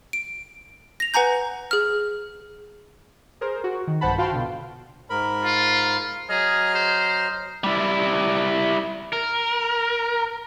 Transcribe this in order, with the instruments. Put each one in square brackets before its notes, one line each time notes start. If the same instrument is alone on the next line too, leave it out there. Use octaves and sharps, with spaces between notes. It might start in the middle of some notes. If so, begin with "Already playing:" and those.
[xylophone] D7
A#6 F7
B4 F#5 G#5 A#5 G6
G#4 F6
[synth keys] G#4 A#4 C5
F#4
D#3
B1 G2 C5 F#5 A5 B5
F4 F#4 F5 G5 A5 C6
B2 D3
[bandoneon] G#2 A#4 B5
[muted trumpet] F4
[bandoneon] F#3 D#5 F6 [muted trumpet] G#4
[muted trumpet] C5
[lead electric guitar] G3 E4
A#4